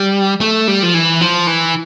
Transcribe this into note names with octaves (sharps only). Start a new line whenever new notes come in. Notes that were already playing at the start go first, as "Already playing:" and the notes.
Already playing: G3
A3
G3
F3
E3
F3
E3